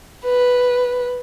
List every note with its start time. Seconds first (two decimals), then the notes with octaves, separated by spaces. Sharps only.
0.24 B4